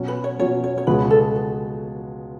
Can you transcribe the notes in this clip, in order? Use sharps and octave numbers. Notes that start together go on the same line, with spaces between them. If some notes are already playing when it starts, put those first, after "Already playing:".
Already playing: B2 F#3 C#4
B4
C#5
B2 F#3 C#4 C#5
C#5
C#5
C#2 B2 G#3 B3 F#4 B4
A4